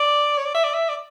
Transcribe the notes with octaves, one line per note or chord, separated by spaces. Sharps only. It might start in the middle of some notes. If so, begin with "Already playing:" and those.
Already playing: D5
C#5
D5
E5
D5
E5
D5